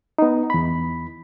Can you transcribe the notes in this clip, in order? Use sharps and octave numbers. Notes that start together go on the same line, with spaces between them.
B3 D#4
E2 B5